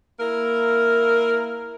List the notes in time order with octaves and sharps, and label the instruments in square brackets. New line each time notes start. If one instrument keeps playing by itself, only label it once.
[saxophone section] A#3 E4 A#4